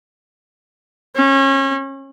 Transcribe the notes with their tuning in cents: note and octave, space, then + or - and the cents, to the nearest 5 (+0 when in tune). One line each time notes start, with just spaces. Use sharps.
C#4 -30